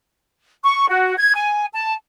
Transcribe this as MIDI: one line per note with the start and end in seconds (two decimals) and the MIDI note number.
0.64 0.89 85
0.89 1.16 66
1.17 1.34 92
1.34 1.66 80
1.73 1.93 81